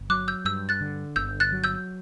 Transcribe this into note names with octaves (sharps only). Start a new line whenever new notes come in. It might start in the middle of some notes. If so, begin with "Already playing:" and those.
Already playing: G1
F#3 D6 F#6
E6 G6
G2 E6 G6
F#6 A6
D3
G1 E6 G6
F#6 A6
F#3
E6 G6